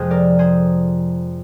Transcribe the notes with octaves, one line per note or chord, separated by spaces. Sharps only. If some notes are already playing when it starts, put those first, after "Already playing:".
Already playing: F2 C3 F3 G#3 G#4 C5
A#4 D5
G#4 C5